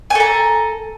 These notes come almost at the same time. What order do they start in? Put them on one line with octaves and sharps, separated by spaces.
G#5 A4 A#5